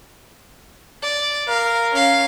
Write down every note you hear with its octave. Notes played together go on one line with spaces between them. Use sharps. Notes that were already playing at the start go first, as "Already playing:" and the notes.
D5
A#4 F5
C#4 F5